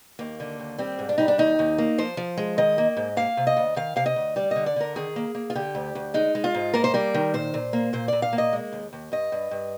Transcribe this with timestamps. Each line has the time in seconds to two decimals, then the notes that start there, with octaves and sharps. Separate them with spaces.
0.19 D#2 A#3
0.40 D3
0.59 D#2
0.78 G3 C4
0.99 G#2
1.09 D4
1.18 G3 D#4
1.28 D4
1.38 D#2 D#4
1.59 D#2
1.78 A#3
1.98 F3 C5
2.17 F3
2.37 G#3
2.58 D#3 D#5
2.78 A#3
2.97 G#2
3.17 A#3 F5
3.37 C3
3.47 D#5
3.57 D2
3.76 D#3 F5
3.96 C3 F5
4.06 D#5
4.16 D2
4.36 G3 D5
4.51 D3 D#5
4.66 D5
4.76 D3 A#4
4.96 D#3 G#4
5.16 A#3
5.35 A#3
5.50 F4
5.55 D3 G4
5.75 D2
5.95 D2
6.14 G#3 D#4
6.35 G#3
6.44 F4
6.54 G#2
6.74 A#3 A#4
6.84 C5
6.94 G3 A#4
7.14 D#3
7.34 A#2 C5
7.54 A#2
7.73 A#3
7.93 A#2 C5
8.08 A#2 D5
8.22 F5
8.33 A#3
8.38 D#5
8.53 G#3
8.72 D#2
8.93 D#2
9.12 G2 D#5
9.32 G2
9.51 G2